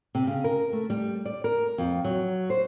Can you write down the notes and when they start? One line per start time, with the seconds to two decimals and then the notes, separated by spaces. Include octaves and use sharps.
0.15 C3
0.27 C#3
0.44 A#4
0.73 A3
0.90 G3
1.25 D5
1.44 A#4
1.78 F2
2.05 F#3
2.50 C5